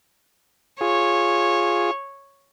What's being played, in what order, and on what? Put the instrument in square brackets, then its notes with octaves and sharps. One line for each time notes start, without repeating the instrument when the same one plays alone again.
[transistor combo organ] F4 G#4 [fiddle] C#5